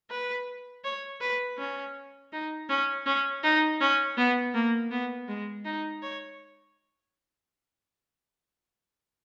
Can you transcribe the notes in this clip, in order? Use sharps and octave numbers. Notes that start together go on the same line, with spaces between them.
B4
C#5
B4
C#4
D#4
C#4
C#4
D#4
C#4
B3
A#3
B3
G#3
D#4
C#5